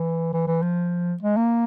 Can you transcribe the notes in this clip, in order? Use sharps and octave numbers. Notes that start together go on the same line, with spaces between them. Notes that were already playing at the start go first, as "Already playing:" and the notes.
Already playing: E3
E3
E3
F3
G#3
A#3